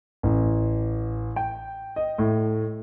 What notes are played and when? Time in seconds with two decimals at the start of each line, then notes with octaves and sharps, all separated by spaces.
0.23 A1
1.36 G5
1.96 D#5
2.18 A2